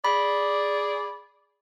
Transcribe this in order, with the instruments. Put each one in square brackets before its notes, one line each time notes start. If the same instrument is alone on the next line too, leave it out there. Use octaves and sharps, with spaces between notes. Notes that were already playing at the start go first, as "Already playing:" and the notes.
[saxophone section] G#4 D5 [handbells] B5